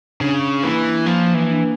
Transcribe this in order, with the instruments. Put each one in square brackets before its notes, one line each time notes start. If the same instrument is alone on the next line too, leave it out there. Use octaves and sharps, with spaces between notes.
[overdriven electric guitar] C#3 [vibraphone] D4
[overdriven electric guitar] E3 [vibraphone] A#3
[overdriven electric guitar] F3 [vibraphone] A#3
[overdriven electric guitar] E3
[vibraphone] D4